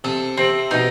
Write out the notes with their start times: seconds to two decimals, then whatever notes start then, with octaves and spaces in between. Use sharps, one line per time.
0.04 C3 A4
0.37 C3 C4
0.71 B2 D#4